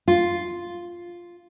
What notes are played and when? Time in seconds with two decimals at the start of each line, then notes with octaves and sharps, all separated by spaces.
0.08 F4